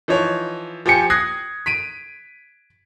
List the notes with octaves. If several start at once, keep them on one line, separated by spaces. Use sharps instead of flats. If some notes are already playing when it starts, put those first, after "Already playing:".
E3 F3 D#4 C#5
F3 G4 G5 G#5 C#7
D#6 F#6 G#6 A#6 C7
B6 D7 D#7